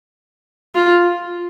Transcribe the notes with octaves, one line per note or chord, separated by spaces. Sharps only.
F4